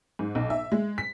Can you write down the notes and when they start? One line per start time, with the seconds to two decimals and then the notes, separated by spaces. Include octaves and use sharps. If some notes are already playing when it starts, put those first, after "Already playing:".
0.19 G#2
0.35 B1
0.50 E5
0.72 G#3
0.98 B6